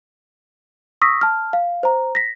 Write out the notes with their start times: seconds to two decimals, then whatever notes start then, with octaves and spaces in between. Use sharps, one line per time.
1.02 C#6 D#6 E6 A#6 B6
1.21 A5 F6
1.53 F5
1.83 C5 A#5
2.15 A#6 B6